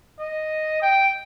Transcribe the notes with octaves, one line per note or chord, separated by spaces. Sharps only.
D#5
G5